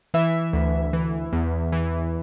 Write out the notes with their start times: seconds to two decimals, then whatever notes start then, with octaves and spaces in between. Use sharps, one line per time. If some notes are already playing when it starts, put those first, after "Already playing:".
0.14 E3 E5
0.53 D2
0.93 E3
1.33 E2
1.72 E3